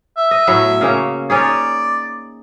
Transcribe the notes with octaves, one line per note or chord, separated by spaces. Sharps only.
E5
D#5
A2 F#3 B3
C#3 A#3 C#4
C#4 D#4 G#4 D5